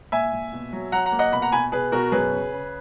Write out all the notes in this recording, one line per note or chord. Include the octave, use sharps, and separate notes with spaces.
A#2 E5 G#5
A#2
B2
F#3
F#3 F#5 A#5
F#5 A#5
A#3
D#5 F#5
B2 B5
F#5 A#5
B2 G#5 B5
B2 G#4 B4
B2 F#4 A#4
F#2 G#4 B4
C#3
C#3